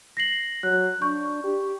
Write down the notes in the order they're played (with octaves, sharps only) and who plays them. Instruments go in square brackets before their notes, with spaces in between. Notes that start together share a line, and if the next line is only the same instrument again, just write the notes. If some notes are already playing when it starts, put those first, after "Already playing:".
[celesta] A#6 C7 F#7
[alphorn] F#3 [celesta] F#6
[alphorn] D4 [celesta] C#6 G6
[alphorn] G4